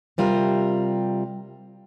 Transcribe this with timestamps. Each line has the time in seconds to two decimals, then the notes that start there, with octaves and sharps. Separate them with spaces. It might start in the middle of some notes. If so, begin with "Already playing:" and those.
0.18 C3 G3 F4 A#4